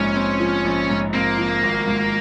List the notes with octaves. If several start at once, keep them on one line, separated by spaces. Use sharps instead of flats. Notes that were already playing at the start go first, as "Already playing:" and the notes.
Already playing: A#1 G#2 C#4
C4
F3
A#1
G#2
A#3 C4
F3
G#1
G#2